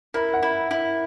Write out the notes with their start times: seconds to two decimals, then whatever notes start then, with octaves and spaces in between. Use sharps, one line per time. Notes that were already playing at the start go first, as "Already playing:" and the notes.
0.14 E4 A#4
0.34 F#5
0.43 E4
0.71 E4